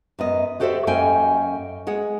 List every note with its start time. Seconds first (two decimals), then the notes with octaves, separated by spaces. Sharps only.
0.19 F#2 B3 D#5
0.60 F#4 G4 A4 C5 D5 E5
0.87 F#2 A#3 C#4 D#5 G5 G#5
1.87 G#3 G#4 F#5